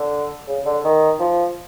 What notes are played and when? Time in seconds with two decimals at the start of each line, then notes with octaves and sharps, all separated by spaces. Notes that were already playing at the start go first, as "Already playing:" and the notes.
Already playing: D3
0.48 C#3
0.66 D3
0.84 D#3
1.20 F3